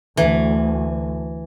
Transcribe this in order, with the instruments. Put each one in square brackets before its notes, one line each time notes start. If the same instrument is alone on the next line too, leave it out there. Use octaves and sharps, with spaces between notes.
[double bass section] D2 [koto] E3